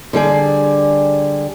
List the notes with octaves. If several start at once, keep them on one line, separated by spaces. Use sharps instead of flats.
D3 G3 G#4 D5